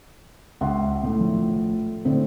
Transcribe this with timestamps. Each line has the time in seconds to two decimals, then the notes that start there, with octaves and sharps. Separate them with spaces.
0.61 C#2 E5 F#5 C6
1.03 A2
1.20 A#1
2.05 A2 D3 C4